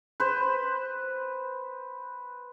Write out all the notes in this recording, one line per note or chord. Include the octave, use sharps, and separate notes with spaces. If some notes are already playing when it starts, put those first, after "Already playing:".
B4 C5